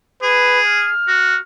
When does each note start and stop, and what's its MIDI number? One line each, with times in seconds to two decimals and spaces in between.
0.22 0.89 68
0.22 0.60 71
0.66 1.42 89
1.08 1.35 66